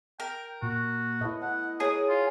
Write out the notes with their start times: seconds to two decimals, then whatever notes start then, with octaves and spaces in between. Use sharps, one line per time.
0.20 A#4 G5
0.62 A#2 F#4
1.21 A3 B3 E4 D#5
1.42 F#5 A5
1.80 G#4 A#4 C#5 D6 D#6
2.09 F4 F#4